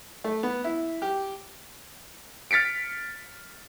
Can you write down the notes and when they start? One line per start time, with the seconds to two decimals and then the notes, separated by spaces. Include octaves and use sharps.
0.24 A3
0.43 B3
0.64 E4
1.02 G4
2.51 F6 A6 B6 C#7 D7